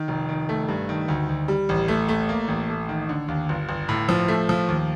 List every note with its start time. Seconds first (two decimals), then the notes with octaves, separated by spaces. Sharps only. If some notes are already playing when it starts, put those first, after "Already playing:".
Already playing: D#3
0.08 F1
0.29 D#3
0.49 A3
0.68 G2
0.89 D#3
1.08 D2
1.29 D2
1.48 G3
1.69 A1
1.88 A3
2.09 A3
2.29 A#3
2.48 A1
2.69 A3
2.89 D#3
3.09 D3
3.28 D#2
3.49 G1
3.69 G1
3.89 A2
4.09 F3
4.28 A3
4.49 F3
4.68 D#2